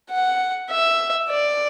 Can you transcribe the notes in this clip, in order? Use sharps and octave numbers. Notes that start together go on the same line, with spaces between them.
F#5
E5
D5